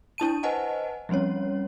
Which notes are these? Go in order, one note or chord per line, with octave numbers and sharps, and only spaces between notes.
D4 E4 A5 D#7
B4 C5 D#5 F#5 G#5 A5
F3 G3 C4 C#4 C#5